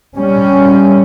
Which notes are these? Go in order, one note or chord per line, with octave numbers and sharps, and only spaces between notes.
G3 C#4